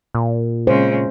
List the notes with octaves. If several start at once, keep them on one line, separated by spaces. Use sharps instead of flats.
A#2
C#3 G#3 C5